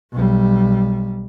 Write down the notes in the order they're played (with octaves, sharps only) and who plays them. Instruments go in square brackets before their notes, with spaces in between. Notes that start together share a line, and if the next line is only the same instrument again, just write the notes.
[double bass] B1 G3